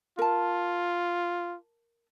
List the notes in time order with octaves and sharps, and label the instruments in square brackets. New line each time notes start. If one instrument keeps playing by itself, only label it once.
[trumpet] F4 [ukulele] A#4 A5